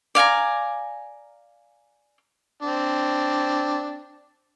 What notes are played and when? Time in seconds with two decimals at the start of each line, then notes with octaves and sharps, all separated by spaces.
0.15 D5 F5 G#5 A#5
2.63 C4 D4